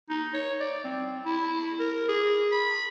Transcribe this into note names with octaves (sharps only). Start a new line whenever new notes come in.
D#4
C#5
D5
C4
E4
A#4
G#4
B5